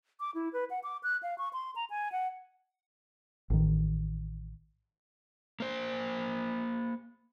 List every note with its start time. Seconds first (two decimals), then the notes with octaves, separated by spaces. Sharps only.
0.20 D6
0.35 E4
0.53 B4
0.70 F#5
0.83 D6
1.03 F#6
1.23 F5
1.38 C#6
1.53 C6
1.76 A#5
1.90 G#5
2.12 F#5
3.50 A1 D#3
5.60 A#3 C5